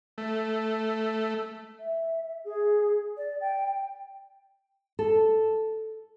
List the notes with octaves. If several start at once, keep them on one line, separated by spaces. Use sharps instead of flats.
A3
E5
G#4
D5
G5
A4